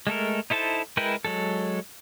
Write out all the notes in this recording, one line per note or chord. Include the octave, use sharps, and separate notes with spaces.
G#3 A3 A4 A#4
D#4 E4 A4 C5 A5
G#3 E4 A#4 B4 G5
F#3 G#3 A4